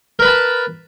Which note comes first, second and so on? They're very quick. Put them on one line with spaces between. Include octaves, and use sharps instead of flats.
A#4 B4 B5 A5